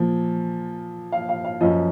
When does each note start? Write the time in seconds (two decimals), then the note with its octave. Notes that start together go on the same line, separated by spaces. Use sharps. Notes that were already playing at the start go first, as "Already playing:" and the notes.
Already playing: A#2 F3
1.12 F5
1.29 F5
1.45 F5
1.61 F#2 F3 D#5